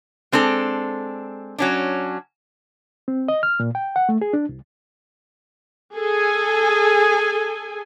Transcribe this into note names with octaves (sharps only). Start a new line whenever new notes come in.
G#3 C4 D4 A4
F#3 C#4 D4
C4
D#5
F6
A#2
G5
F#5
A3
G#4
D4
C2
G#4 A4 G#5